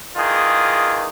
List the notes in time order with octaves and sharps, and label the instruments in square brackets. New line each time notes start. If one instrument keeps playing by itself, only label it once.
[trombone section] E2 D#3 F4 G#4